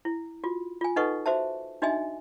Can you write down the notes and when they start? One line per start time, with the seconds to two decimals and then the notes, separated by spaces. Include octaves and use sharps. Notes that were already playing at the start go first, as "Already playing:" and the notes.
0.05 E4
0.44 F4 F#4
0.81 F4 G#5
0.96 D#4 A4 B4 D#5 F#5 C#6
1.26 F#4 C5 E5 A5
1.82 D4 D#4 F#4 D#5 E5 G#5